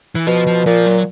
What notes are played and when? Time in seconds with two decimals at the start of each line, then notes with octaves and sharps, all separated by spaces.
0.15 E3
0.26 B2 F3
0.47 F3
0.66 A#2 F3
0.86 F#3